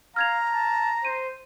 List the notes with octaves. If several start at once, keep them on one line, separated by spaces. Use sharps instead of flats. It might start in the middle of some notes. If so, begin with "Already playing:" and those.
F5 A#5 F6 G#6 F7
A5
C5 D#7